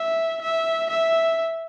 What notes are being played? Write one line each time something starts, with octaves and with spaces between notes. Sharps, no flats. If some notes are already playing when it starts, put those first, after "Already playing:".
Already playing: E5
E5
E5